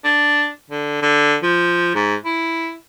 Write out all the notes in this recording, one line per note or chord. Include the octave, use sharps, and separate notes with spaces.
D4
D3
D3
F3
G#2
E4